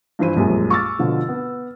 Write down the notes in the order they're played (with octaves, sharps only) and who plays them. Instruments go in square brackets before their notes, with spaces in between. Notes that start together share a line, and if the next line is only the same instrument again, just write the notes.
[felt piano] G2 E3 F3 E4 C5 D#7
A#1 F#2 G3 G#3
C#6 D6 E6 F6 A6
B2 D3 F3
B3